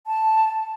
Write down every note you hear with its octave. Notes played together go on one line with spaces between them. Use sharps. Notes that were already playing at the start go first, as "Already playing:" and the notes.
A5